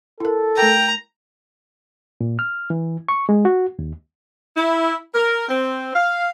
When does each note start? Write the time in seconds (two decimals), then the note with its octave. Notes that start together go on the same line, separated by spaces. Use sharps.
0.20 E4 A4 A#4
0.58 A3 A#4 G5 A#5
2.21 A#2
2.39 F6
2.70 E3
3.09 C#6
3.29 G#3
3.45 F#4
3.79 D#2
4.57 E4
5.14 A#4
5.49 C4
5.94 F5